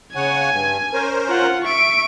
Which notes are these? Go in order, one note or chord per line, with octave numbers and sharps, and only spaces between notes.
C#3 C#5 F#5 G#5
G2
C#4 A#4 C5
F4 F#5
E5 C#6 D7